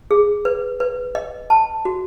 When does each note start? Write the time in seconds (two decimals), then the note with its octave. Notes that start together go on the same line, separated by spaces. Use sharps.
0.11 G#4
0.45 B4
0.80 B4
1.15 D#5
1.50 A5
1.85 F#4